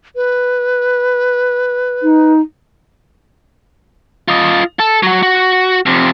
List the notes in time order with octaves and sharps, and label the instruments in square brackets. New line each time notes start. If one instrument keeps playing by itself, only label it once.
[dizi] B4
[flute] D#4
[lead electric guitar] F4 D#5
A4
F#3 F#4
F#4
F2 C3